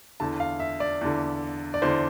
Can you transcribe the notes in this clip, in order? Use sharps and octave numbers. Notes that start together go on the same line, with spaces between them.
E2 D3 A5
F5
E5
D5
E2 D3
D5
E2 D3 C5